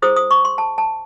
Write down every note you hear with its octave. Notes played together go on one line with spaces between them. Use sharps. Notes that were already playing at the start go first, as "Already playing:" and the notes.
E4 G#4 C5 D#6
D#6
C#6
C6
A5
A5